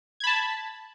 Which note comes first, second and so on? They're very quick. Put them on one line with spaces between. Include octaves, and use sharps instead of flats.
G#6 B5 A5